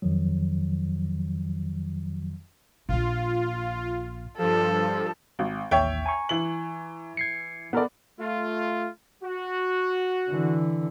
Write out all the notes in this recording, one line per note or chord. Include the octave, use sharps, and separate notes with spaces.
F2 D#3 F3 F#3
A#1 A#2 F4
G2 F3 A4
G#1
A1 D#2 C#5 E5 G5
G#5 A#5 C#6
E3 F#7
G#6 C7 C#7
B3 A4 A#4 D5 F#5
A3 F4
F#4
D3 E3